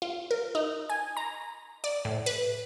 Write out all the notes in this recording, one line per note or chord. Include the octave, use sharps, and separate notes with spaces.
F4
A#4
D#4
G#5
A#5
D5
A2
B4